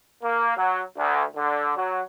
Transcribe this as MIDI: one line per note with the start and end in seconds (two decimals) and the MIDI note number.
0.23 0.54 58
0.57 0.81 54
0.97 1.22 38
1.36 1.76 50
1.77 2.01 54